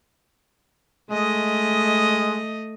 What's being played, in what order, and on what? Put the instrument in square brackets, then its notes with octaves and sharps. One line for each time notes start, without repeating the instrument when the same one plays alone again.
[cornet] G#3 [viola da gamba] A3 D#5